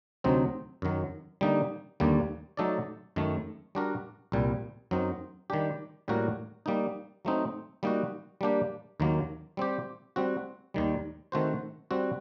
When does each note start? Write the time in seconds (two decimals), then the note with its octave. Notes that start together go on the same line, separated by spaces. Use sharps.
0.24 D2 C3 F#3 C4 D#4
0.82 F#2 D#3 F#3
1.41 D3 G3 A#3 D#4
2.00 D#2 D3 G3 A#3
2.57 F#3 A3 D#4 A4 D5
3.16 F#2 D#3 A3
3.75 G3 D4 F#4 A#4
4.32 C2 A#2 G3
4.91 F#2 F#3 C4 D#4
5.50 D#3 G3 D4 G4
6.08 A2 G3 A#3 F#4 A#4
6.66 G3 A#3 D#4
7.25 F#3 A3 C4 D#4
7.83 G3 A#3 D#4 F#4
8.41 G3 A#3 D4 G4
9.00 D#2 D#3 F#3 A#3
9.57 G3 C4 G4
10.16 G3 C4 F#4
10.74 D#2 D#3 G3
11.32 D#3 A3 C4 F#4 C5
11.91 G3 C4 F#4